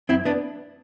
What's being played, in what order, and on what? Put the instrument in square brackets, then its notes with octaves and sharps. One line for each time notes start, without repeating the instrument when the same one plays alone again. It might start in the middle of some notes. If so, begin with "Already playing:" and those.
[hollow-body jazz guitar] F#2 C4 E4
B3 D4